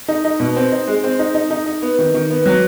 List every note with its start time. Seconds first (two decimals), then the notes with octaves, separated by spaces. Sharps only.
0.08 D#4
0.25 D#4
0.40 B2
0.56 C4
0.72 D#4
0.87 G#3
1.04 C4
1.19 D#4
1.35 D#4
1.51 D#4
1.66 D#4
1.82 B3
1.99 D#3
2.14 D#3
2.30 B3
2.46 F#3